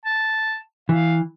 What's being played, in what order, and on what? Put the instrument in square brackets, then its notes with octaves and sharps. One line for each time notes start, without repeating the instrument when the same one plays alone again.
[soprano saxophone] A5
[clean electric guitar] E3 [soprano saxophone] F5